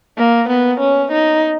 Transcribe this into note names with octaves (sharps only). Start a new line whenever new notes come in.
A#3
B3
C#4
D#4